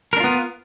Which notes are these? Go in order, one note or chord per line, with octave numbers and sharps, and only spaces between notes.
B3 D4 F4 A#4